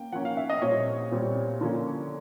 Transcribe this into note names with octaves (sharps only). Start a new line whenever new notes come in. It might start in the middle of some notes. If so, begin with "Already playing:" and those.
Already playing: A#3 C#4 G5
F3 A#3 C#4 F#5
F5
E5
D#5
A#2 G3 C4 C#5
A#2 G3 C4
D3 F3 A#3 C#4